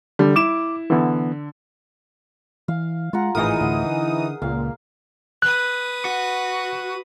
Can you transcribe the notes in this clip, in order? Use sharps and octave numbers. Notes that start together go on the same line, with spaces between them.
D3 G3
E4 D6 E7
D3 E3 B3
E3 F5
G#3 F4 F#5 A#5
G#1 A2 E3 D#4 G#4 A#4 D#6
D2 A2 D3 F#5
D3
C#2 A#2 F5
B4 D#6 F#6
F#4